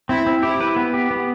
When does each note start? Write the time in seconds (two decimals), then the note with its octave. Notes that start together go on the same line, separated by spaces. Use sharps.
0.09 C4 E4
0.26 C4
0.43 E4 G4
0.61 B4
0.76 B3
0.94 G4
1.11 B3